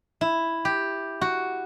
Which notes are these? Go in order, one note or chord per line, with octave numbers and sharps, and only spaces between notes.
E4
G4
F#4